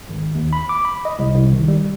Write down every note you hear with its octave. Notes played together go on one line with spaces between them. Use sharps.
G#1
D#2
B5
D6
B5
D#5
C2
C2
D#3
G3